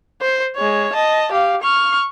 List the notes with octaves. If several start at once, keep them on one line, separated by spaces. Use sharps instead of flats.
C5
G#3 C#5
D#5 A5
G4 F5
C#6 F6